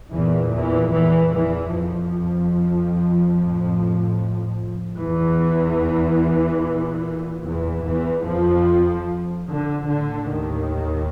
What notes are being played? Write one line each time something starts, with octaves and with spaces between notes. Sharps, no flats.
E2 A#2 E3
E2 E3
E2 E3
E2 E3
F2 F3
A2
E2 E3
A#2
E2 E3
E2 E3
F2 F3
D3
A2 D3
D#2 D#3